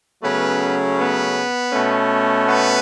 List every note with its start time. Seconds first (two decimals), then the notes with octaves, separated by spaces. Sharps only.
0.23 C#3 F#3 A3 B3 C#4 B4
0.97 B3 B4
1.73 B2 A3 C#4
2.46 B3 B4